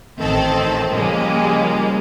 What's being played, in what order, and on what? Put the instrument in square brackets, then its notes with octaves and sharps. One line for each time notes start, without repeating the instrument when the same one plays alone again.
[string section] A1 D#3 C4 A4
C#3 F3 G3 G#3 A#3